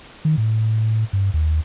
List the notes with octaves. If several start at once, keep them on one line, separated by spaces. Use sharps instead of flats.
D#3
A2
G2
D#2